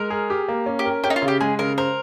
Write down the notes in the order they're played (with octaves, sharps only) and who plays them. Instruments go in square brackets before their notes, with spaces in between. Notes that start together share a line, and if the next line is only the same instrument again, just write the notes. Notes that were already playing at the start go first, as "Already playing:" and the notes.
Already playing: [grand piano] G#3 [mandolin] A#4
[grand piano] G#4
G4
A#3
C#4
[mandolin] G4
[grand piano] A#4
[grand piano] C#4 [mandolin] G4
[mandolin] D#4
F4
[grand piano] C#3
[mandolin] G4
[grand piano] G#3 [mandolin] G#4
[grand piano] C#3 [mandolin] A#4
[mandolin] A#4 [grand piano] C5